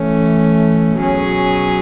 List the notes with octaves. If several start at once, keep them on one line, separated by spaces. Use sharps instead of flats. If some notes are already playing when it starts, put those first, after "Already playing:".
Already playing: E3 A3 C#4
B2 F#3 C#4 G#4